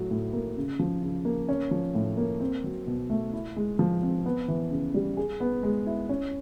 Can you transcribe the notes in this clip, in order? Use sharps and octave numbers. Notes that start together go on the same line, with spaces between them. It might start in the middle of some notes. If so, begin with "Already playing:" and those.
Already playing: A2 F#3
A2
A#3
C#3
F3
C#3
A#3
C#4
F3
A2
A#3
C4
F#3
B2
A3
E4
G#3
F3
C4
B3
E3
C#3
G3
G#4
B3
G#3
E4
C#4